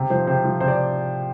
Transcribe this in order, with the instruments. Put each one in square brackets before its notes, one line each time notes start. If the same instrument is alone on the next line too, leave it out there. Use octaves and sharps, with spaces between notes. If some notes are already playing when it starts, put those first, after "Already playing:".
Already playing: [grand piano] C3
F3 C5
C3 C5
F3
C3 C5
D5